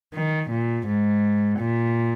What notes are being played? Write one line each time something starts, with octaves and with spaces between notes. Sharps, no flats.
D#3
A#2
G#2
A#2